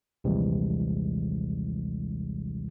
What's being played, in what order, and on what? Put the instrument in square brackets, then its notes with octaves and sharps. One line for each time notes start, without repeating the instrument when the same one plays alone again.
[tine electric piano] A#1 D#2 C3 E3 G3 G#3